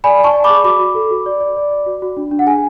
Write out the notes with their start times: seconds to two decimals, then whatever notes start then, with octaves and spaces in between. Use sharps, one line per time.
0.04 D5 G#5 B5
0.19 D5
0.24 A5 C#6
0.33 D5
0.44 B5 D6
0.50 G#4
0.64 F#4 B5 D6
0.79 F#4
0.95 A4
1.11 F#4
1.26 D5
1.40 D5
1.56 D5
1.71 D5
1.86 F#4
2.02 F#4
2.17 D4
2.31 D4
2.39 F#5
2.47 G#4 G#5